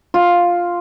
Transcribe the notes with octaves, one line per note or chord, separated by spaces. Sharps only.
F4